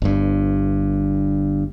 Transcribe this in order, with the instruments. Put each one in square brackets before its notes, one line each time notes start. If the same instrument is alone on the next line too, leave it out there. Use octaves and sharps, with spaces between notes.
[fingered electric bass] G1 G2